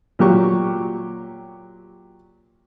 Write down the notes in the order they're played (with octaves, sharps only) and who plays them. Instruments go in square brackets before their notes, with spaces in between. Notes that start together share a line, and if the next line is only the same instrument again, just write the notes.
[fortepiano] A#2 F#3 G4 C#6